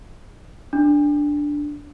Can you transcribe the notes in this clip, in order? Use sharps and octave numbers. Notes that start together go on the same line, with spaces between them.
D4